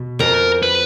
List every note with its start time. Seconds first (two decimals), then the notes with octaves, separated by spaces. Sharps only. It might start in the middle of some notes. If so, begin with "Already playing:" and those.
Already playing: B2
0.19 F2 F3 A#4
0.63 B4